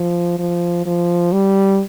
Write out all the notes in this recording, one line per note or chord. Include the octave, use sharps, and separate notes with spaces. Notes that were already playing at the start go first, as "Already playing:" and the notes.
Already playing: F3
F3
F3
G3